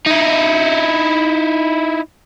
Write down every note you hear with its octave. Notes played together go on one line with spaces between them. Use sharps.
D#4 E4